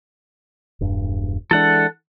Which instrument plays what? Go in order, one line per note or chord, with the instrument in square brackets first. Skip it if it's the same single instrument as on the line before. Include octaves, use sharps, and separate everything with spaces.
[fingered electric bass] E1 G2
[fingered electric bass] E3 G#3 D4 [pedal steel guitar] A4 F#5